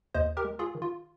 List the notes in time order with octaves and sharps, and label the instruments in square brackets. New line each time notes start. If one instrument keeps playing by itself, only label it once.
[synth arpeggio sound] D#2 C5 D#5
G4 A#4
G#3
F4 G#4
D#3
F4